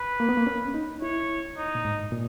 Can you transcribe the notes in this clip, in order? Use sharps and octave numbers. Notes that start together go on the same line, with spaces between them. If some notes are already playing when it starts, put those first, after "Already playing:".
Already playing: B4
A#3
B3
A#3
C#4
D#4
E4 C#5
D#4
A#2
G#2
A#2